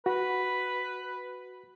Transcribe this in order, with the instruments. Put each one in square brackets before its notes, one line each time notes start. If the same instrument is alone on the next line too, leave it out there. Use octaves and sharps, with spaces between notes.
[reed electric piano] F#4 [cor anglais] B4